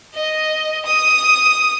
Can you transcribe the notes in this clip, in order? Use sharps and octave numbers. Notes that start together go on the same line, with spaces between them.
D#5
D#6